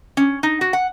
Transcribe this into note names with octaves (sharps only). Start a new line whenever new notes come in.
C#4
D#4
F#4
F#5